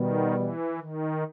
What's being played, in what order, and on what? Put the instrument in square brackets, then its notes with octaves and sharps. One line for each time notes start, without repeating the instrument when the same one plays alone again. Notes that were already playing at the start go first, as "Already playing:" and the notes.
Already playing: [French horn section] B2 G3 B3 [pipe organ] D#3
[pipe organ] E3
D#3